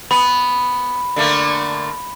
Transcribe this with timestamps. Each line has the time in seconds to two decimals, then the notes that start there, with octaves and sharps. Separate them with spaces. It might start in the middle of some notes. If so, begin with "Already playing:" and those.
0.11 B3 B5
1.16 D3 A3 A#3